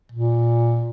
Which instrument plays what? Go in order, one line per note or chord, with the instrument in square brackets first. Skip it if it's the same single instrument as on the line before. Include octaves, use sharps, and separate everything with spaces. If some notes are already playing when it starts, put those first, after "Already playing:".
[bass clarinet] A#2